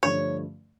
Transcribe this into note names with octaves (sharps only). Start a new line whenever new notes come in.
G2 D3 F3 A3 C#5